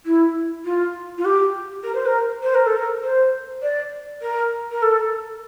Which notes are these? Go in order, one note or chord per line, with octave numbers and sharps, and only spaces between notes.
E4
F4
F4
G4
A#4
C5
A#4
C5
A#4
A4
A#4
C5
D5
A#4
A#4
A4